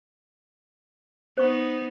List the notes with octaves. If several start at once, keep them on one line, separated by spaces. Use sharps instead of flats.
B3 D#4 C5 C#6